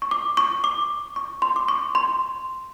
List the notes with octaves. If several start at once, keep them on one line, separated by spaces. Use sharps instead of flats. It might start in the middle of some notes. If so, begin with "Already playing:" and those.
C#6
D6
C#6
D6
C#6
C6
D6
C#6
C6